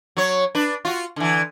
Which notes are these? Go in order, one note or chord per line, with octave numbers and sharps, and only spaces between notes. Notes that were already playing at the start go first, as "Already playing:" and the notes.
F#3 C#5
D4 B4
F4 F#4
D3 E3